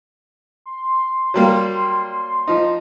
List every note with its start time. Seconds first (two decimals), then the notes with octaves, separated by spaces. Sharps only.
0.66 C6
1.34 F#3 G3 A#3
2.48 F3 D#4